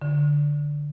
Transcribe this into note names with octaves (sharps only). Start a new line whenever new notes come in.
D3